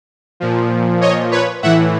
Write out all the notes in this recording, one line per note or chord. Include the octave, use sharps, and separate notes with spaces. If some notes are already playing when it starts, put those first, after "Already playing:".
A#2 F3
C#5 D#5
B4 C#5
A2 E3 E5 F#5